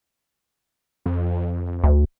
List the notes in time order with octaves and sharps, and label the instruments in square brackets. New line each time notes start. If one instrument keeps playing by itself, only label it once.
[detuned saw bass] F2
[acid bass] D2